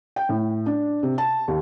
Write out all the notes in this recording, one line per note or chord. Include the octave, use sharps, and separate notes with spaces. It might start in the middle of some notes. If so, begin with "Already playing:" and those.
G5
A2
D4
C3
A5
D#2